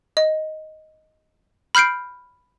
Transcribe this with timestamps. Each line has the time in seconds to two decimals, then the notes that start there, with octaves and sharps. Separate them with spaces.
0.17 D#5
1.75 B5 F6 G6 C7 D7